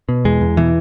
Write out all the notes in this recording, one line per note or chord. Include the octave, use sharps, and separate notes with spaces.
B2
E2 G#3
E2
B2 E3